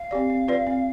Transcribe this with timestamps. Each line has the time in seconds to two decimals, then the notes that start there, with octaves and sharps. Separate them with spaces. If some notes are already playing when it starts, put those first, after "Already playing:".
Already playing: F5
0.11 C4 G4 D5
0.30 C4
0.48 F4 B4 D5
0.67 C4